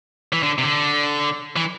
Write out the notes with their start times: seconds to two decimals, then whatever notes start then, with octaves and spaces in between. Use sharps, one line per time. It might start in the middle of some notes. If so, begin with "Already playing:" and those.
0.33 E3
0.43 D3
0.58 C3
0.63 D3
1.56 E3